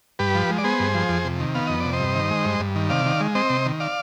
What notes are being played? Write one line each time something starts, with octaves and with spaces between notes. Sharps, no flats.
G2 G4 B4
F3
G#3
D5
B3 G#4 C5
G2
F3
F2
C3
D#3
B3 F5
F2 D#5
C3 D5
C5 D#5
G2
D#3
G#3
G2
G2
D#3
C3 D5 F5
D#3
G#3
C4 C5 D#5
C3
D#3
D5 F5